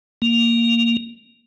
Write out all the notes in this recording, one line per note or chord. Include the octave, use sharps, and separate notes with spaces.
A#3